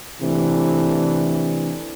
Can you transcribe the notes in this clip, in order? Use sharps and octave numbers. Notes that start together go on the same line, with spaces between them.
C3 E3 A3 D4